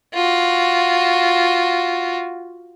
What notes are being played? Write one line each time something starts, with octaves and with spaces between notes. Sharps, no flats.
F4 F#4